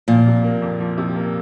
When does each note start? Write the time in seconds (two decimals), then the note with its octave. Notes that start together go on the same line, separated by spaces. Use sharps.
0.08 A#2 F3
0.27 C3
0.44 A#3
0.62 F2
0.80 F3
0.98 C3
1.16 A#3